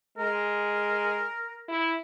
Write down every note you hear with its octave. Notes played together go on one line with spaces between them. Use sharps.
G#3 A#4
E4